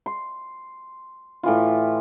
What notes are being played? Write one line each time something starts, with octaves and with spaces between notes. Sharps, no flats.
C6
A2 E3 F4